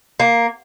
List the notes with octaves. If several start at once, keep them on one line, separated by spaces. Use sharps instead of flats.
A#3